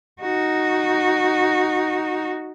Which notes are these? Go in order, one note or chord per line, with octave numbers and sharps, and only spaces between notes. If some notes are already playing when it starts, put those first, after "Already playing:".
D#4 F#4